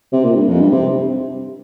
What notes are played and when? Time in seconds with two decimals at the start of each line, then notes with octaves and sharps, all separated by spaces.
0.12 C3
0.24 A#2
0.36 G2
0.48 F2
0.60 G2
0.72 C3